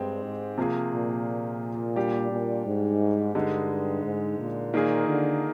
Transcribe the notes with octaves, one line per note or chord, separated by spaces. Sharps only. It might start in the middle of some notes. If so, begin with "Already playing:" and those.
Already playing: G2 G#3 C4 G4
G#2
C3 F3 A#3 F4 G#4
A#2
G3 D4 G4
A#2
G#2
G2 D3 G#3 D#4
G#2
A#2
D#3 A#3 F4 G#4
D3